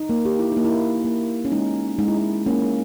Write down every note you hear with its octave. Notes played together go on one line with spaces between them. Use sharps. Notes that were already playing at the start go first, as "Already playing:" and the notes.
Already playing: D#4
A#3
G4
E4
A#3 D#4
E4
A#3
C#4
G#3 D#4
G#3 D#4
E4
D#4
A#3 C#4